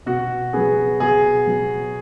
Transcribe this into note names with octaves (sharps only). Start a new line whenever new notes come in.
B2 F#4
F#3 B3 G#4
B2 G#4
F#3 B3